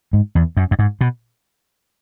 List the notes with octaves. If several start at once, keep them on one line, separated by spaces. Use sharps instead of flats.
G#2
E2
F#2
F#2
G#2
B2